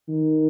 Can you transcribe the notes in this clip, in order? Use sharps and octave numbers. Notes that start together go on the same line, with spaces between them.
D#3